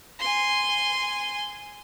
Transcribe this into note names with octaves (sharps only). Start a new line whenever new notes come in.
G#5 C6